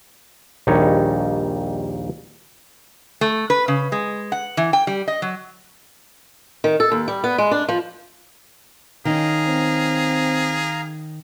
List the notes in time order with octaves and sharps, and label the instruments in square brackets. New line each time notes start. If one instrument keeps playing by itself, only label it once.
[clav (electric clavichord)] A#1 D#2 G3 D#4 C#5
[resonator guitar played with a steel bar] A3
B4
C#3
G#3
F#5
E3
G5
G3
D#5
F#3
[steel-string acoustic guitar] D#3
A4
D#2
G3
B3
G#3
D4
F3
[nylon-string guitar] D#3 C#4 [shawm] G#4 [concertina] F5 A#5
[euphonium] C4